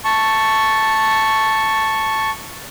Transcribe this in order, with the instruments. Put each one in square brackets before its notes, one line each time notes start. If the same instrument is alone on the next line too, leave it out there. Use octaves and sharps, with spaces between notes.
[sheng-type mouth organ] A5 C#6